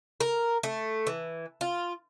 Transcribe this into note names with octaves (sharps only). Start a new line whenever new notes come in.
A#4
A3
E3
F4